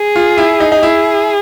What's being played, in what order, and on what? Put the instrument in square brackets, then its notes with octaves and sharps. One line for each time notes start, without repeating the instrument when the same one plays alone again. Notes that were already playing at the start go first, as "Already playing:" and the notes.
Already playing: [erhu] G#4
[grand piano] F4
E4
D#4
D#4
[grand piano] E4 [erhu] G#4